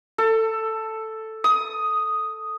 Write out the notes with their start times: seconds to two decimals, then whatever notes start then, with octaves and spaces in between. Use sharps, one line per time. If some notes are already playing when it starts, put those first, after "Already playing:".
0.18 A4
1.44 D#6